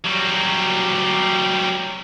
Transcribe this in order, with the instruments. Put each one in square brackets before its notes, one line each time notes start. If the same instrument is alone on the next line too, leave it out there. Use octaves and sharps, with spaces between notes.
[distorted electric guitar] F#3 G3